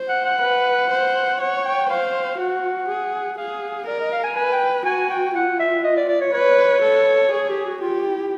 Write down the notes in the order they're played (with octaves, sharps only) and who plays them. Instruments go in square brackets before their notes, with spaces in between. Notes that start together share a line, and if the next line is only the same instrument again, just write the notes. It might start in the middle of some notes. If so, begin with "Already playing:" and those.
Already playing: [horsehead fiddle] C5
[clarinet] F#5
F#5
[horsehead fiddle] B4
C5
[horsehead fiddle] C#5 [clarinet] F#5
[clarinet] G5
[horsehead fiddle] C5 [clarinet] F5
[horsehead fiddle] F#4 [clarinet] F#5
[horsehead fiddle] G#4
[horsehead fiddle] G#4 [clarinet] F5
[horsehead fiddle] A#4 [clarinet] D5
[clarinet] D#5
F5
G#5
[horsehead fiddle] B4 [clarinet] G#5
[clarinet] G5
[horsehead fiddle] F#4 [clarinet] G#5
[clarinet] G5
[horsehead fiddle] F4 [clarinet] F#5
[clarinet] E5
D#5
D5
D5
C#5
[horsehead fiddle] B4 [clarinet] C#5
[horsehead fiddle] A4
[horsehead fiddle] G#4 [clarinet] C#5
[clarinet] G4
F#4
[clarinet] F4 [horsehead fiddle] G4
[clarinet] E4